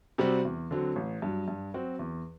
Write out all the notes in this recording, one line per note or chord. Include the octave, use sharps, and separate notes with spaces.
C3 G3 C4 F#4
E2
D3 F#3 C4
A1
G2 F#3
G2
F#3 C4 F#4
E2